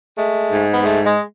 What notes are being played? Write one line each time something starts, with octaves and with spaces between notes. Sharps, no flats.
G#3 A3
G#2
B3
G#3 A3
G#3